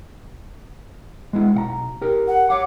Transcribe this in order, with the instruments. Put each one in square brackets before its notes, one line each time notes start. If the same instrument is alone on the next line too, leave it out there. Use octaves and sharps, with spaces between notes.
[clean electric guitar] G#3 B3 E4
B1 F#5 A#5
G4 A#4
[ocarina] F#5
[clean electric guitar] C#5 F#5 [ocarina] D6